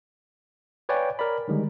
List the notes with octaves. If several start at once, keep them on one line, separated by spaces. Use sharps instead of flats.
B4 C#5 D5 F5 G5 G#5
A#4 C#5 D5 B5
D3 D#3 G3 G#3